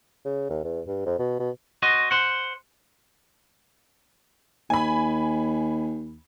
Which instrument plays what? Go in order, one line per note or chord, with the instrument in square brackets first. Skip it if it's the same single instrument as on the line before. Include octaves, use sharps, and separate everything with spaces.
[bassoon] C#3
D#2
E2
G2
F2
B2
B2
[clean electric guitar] F#4 C5 D#5
C5 F#5
[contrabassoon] D#2 [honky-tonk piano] G#5 B5